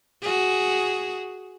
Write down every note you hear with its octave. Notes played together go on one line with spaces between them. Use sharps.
F#4 G#4